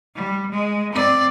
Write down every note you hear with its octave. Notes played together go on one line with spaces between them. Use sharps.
G3
G#3
C4 D5